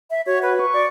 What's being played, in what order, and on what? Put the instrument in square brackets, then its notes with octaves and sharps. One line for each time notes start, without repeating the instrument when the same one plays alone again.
[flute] E5
[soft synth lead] F#4 [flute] C#5
[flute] B4
[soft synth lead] C#6
[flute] D5